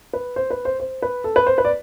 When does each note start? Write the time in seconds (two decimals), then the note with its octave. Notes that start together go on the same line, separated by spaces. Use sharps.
0.13 B4
0.36 C5
0.50 B4
0.65 C5
0.80 C5
1.02 B4
1.24 A4
1.36 B4
1.47 C5
1.58 B4
1.65 D5